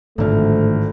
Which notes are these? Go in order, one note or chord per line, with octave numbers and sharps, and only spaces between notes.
G#1 A2 D3 F3 A3 F6